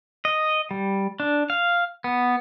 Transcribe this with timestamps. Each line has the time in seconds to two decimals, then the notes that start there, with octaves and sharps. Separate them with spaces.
0.25 D#5
0.71 G3
1.20 D4
1.50 F5
2.04 B3